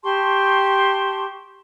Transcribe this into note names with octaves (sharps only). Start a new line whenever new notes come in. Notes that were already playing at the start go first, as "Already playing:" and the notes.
G4 A5 C6 C#6